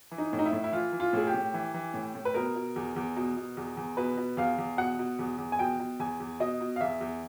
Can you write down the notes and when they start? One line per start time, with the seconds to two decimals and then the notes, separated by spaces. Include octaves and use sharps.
0.11 E3
0.18 D#4
0.33 A2
0.39 D#4
0.46 E4
0.53 A2
0.64 E4
0.72 E3 F4
0.93 E3
1.00 F4
1.13 A2 G#4
1.27 G4
1.34 A2
1.54 E3
1.74 E3
1.94 A2
2.15 A2
2.25 B4
2.34 B2 A#4
2.55 B2
2.76 E2
2.96 E2
3.17 B2
3.37 B2
3.57 E2
3.77 E2
3.97 B2 B4
4.17 B2
4.37 E2 F5
4.58 E2
4.77 B2 F#5
4.99 B2
5.19 E2
5.38 E2
5.52 G#5
5.59 B2 G5
5.79 B2
6.00 E2 G#5
6.20 E2
6.40 B2 D#5
6.61 B2
6.76 F5
6.81 E2 E5
7.01 E2